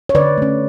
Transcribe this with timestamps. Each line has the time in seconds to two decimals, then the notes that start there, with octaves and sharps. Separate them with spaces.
0.09 C#5
0.15 D3 B4 D5
0.38 A3 C#4